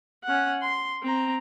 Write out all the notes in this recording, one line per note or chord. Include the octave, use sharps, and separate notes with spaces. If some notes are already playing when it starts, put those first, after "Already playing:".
C#4 F#5
C6
C4 A#5